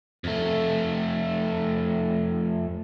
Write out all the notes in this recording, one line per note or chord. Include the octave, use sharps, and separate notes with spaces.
F2 A3